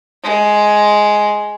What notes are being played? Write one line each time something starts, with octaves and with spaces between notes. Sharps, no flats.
G#3